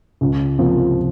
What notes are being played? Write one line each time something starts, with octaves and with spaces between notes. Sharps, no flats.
C#2
C3 F3 A#3